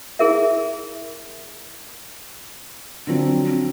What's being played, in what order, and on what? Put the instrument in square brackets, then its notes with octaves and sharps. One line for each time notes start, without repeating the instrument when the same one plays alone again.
[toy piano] E4 G#4 A#4 E5
[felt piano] D3 F3 F#3 [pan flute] C4
[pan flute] C4